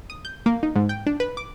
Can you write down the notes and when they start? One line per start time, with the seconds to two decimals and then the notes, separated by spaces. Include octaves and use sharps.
0.10 D#6
0.25 G6
0.46 A#3
0.63 D#4
0.76 G#2
0.89 G5
1.07 D4
1.20 B4
1.37 D6